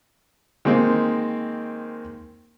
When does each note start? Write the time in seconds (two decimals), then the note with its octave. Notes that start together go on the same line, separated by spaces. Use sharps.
0.65 D#3 G#3 A#3 C4